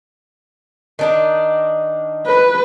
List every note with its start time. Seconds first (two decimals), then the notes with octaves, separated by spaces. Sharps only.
0.99 D#3 D4 D#4
2.27 B4